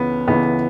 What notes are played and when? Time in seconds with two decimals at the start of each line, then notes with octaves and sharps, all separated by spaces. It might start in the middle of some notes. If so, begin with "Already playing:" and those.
Already playing: C#2 C#3 E3 B3
0.28 C#2 C#3 E3 B3